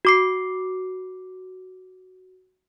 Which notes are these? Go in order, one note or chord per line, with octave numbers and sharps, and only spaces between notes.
F#4 D6 C7